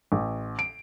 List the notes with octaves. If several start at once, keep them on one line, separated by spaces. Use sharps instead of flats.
A1
D7